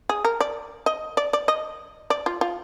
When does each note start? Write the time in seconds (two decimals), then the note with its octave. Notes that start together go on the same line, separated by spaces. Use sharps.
0.09 G#4
0.25 A#4
0.41 D5
0.86 D#5
1.17 D5
1.33 D5
1.48 D#5
2.10 D5
2.26 F4
2.41 F4